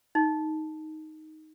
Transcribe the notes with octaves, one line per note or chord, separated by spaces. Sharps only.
D#4